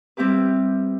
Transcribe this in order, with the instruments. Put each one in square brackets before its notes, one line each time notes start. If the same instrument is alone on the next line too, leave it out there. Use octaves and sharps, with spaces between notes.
[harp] G3 C4 E4 G4 B4